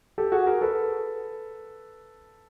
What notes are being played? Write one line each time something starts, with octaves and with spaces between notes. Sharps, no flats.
G4 A4
F#4 G#4
G#4 A#4
A4 B4